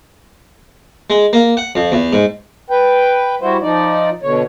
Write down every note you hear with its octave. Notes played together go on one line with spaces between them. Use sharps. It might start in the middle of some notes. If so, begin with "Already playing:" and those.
G#3
A#3
F#5
F2
E2
G#2
B4 G5
G3 E4 F#4 C5
F3 D#4 D5
B2 D3 C#5